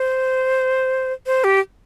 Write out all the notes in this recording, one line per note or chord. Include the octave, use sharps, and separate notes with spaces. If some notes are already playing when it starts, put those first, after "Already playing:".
Already playing: C5
C5
G4